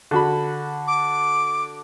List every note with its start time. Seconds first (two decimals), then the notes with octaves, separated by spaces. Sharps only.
0.11 D3 F#4 B5
0.87 D6